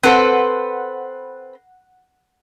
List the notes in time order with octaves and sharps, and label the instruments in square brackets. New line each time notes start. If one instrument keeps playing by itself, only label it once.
[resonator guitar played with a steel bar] C4 A4 C5 [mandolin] B4 [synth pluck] F#5